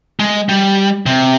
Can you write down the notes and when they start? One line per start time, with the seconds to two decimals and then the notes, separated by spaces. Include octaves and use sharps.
0.19 G#3
0.49 G3
1.06 C3